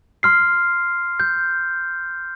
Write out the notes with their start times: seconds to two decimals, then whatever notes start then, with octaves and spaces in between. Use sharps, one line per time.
0.23 C6 F6 C7
1.20 G6